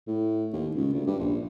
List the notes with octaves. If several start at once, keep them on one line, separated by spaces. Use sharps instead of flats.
A2
D#2
C#2
D2
G2
A#1